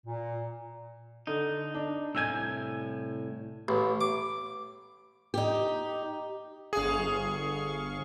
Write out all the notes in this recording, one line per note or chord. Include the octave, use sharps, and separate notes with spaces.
A#2
D3 D#4
D4
C2 A2 G#5 E6 G6 G#6
A1
D6
D#4 G4
G1 G#4 F5 C#6